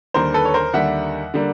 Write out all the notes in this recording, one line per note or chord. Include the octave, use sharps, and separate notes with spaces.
D#2 D3 G3 A#3 A#4 C5
A4 B4
C#5
A#4 C5
D#2 D3 G3 A#3 E5 F#5
D3 G3 A#3